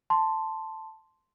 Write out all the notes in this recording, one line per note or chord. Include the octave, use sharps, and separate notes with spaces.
A5 C6